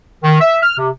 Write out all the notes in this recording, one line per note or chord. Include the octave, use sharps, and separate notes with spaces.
D#3
E5
F6
C3